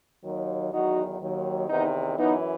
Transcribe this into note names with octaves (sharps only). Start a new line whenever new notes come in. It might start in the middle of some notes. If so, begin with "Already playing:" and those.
D#2 D#3 F#3
E2 D#3 F#3 D#4 F#4
D#2 D#3 F#3
E2 C3 D#3 B3 D#4
F#2 E3 B3 D#4